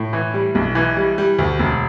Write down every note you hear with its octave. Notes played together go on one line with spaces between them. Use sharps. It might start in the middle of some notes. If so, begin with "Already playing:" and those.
Already playing: A2
E3
G3
B1
E3
G3
G3
D2
E1